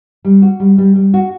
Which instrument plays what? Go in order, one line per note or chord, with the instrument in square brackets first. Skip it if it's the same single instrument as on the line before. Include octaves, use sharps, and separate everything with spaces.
[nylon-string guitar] G3
F#4
G3
G3
G3
F#4